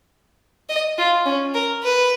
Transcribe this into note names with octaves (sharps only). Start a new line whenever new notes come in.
D#5
F4
C#4
A#4
B4